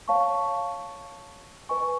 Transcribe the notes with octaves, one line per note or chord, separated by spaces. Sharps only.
C#5 F5 A5 C#6
B4 D#5 G#5 C#6